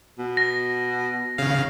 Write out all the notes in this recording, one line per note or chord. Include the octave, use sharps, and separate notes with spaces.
B2
A#6
C#3 F5